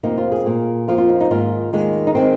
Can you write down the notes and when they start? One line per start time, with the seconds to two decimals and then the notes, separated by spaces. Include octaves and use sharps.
0.03 F2 C3 F3 A#3 D#4
0.17 F4
0.32 G#4
0.46 A#2 A#3
0.88 F2 F3 A#3 F4
0.98 F4
1.09 D#4
1.20 D#4
1.31 G#2 D#3 A#3 F4
1.73 D#2 D#3 G#3
2.07 D#4
2.15 D#3 G#3 C4